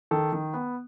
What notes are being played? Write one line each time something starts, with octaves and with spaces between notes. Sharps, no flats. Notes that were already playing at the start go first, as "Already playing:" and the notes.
D#3 A4
D#3
B3